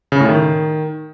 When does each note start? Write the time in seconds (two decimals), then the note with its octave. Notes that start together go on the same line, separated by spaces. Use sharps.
0.12 C#3
0.20 A2
0.29 D#3